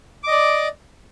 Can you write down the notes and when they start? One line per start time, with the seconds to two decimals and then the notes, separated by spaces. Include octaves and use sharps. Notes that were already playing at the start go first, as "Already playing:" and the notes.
0.24 D6
0.28 D#5
0.32 D5